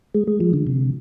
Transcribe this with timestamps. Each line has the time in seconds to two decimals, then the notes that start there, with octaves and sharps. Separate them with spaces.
0.15 G#3
0.28 G#3
0.40 F3
0.53 D3
0.67 C3